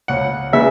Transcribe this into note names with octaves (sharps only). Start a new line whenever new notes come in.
C#2 F#5
C#3 G#3 B3 E5